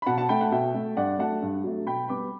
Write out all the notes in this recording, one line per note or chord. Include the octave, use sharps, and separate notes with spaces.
B5
B2 F#5 A5
F#5 A5
A3 G5 B5
F#5 A5
B2 E5 G5
A3
G2 D5 F#5
F#3 A3 F#5 A5
G2
F#3 A3
B2 G5 B5
G3 B3 B5 D6